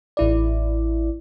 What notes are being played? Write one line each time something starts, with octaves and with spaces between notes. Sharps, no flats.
A1 E4 D5